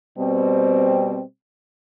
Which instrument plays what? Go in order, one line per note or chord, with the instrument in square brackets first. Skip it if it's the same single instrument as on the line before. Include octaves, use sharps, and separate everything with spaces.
[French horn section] B2 G3 C4